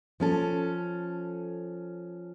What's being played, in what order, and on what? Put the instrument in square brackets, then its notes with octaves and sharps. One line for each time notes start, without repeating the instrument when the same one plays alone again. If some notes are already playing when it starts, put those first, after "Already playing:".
[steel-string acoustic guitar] F3 C#4 A4